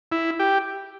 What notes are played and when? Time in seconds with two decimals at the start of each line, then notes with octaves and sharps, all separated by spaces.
0.12 E4
0.39 G4